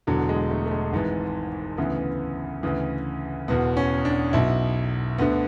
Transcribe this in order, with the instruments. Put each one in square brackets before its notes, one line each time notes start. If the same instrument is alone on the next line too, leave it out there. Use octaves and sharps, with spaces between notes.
[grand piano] E1 E2 D3 F#3
G#3
A3
A3
G#3
G#1 G#2 E3
D2 C#3 E3 B3
D2 C#3 E3
E1 E2 B2 B3
C#4
D4
B1 B2 E4
D2 D3 B3